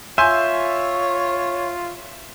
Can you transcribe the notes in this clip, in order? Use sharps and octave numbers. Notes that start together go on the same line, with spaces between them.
F4 C#5 E5 G#5 C6 G6